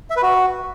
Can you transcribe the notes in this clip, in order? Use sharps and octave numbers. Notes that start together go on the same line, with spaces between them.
E5
B4
F#4